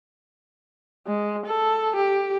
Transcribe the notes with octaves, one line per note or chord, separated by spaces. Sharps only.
G#3
A4
G4